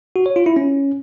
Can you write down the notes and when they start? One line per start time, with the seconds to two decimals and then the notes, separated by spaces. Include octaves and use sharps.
0.16 F#4
0.26 C#5
0.36 F4
0.46 E4
0.56 C#4